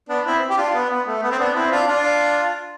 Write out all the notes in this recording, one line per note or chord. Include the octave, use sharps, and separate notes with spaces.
B3 D4
C4 E4
G4
D4 F4
B3
B3
A3
B3
C4
B3 D4
C4 E4
D4 F4
D4 F4